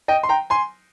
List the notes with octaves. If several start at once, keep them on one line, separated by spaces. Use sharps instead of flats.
D#5 G5
C6
G5 A#5
G#5 C6